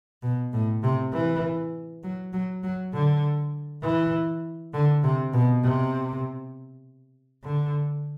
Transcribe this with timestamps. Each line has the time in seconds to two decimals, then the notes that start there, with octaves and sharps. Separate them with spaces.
0.23 B2
0.53 A2
0.83 C3
1.13 E3
2.03 F#3
2.33 F#3
2.63 F#3
2.94 D3
3.83 E3
4.74 D3
5.03 C3
5.33 B2
5.63 C3
7.43 D3